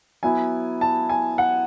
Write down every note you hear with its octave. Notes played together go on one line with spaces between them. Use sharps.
F#3 B3 E4 G#5
A5
G#5
F#5